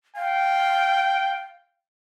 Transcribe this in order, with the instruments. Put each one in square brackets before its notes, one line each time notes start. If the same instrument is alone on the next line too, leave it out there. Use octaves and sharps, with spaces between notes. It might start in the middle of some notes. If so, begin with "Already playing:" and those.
[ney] F5 [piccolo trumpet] G5